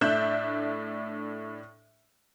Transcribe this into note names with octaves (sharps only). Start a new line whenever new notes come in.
A2 D4 E5 F#6 G6 E7